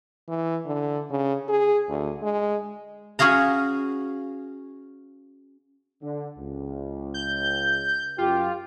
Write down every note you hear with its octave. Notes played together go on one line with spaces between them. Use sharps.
E3
D3
C#3
G#4
D2
G#3
C#4 F#4 G#4 F5 A#5
D3
C#2
G6
F#2 F4 G4